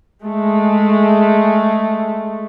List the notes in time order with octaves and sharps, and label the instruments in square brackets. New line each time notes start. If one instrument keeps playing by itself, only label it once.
[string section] G#3 A3